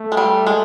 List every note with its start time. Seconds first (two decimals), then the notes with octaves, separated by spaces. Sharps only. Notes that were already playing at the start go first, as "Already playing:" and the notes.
Already playing: A3
0.12 G#3
0.17 G3
0.47 G#3